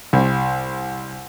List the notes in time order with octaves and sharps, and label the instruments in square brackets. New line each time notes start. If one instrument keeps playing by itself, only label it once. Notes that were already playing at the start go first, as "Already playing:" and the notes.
[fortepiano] C2